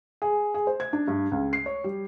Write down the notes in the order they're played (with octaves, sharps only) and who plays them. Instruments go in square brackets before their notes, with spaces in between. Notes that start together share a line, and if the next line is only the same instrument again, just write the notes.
[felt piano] G#4
G#4
C5
G#6
D4
G2
C#2
C7
C#5
G3